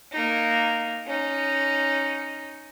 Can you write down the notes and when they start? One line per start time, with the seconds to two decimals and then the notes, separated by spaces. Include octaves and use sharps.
0.12 A#3 D#4
1.06 C#4 D#4